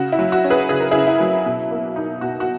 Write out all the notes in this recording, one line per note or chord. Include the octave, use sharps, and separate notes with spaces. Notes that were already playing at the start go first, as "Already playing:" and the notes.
Already playing: C#3 F#4
E4
F#3
F#4
C#4
G#4 B4
C#3 G#4
A#4
C#3 E4 G#4
E4
F#3
B2
A#3
D#4
B2 F#4
F#4